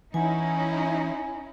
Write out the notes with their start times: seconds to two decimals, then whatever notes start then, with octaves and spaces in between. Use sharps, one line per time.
0.14 E3 C#4 D#4 E4 F#5 G#5